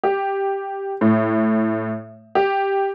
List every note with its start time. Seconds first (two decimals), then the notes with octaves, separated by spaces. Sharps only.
0.03 G4
1.01 A2
2.35 G4